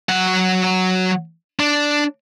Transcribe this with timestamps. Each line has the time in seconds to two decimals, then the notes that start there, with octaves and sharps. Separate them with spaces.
0.09 F#3 F#5
1.60 D4